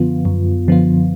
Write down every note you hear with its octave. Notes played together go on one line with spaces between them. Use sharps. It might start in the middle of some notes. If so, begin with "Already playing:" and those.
Already playing: F#2 D3 F3 B3 F4
F#2
D3 F3 B3 F4